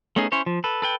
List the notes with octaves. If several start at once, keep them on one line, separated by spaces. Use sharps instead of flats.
A3 B3 C#4 D#4 G#4
C#4 E4 C5 C#5
F3
A4 B4
A4 B4 G5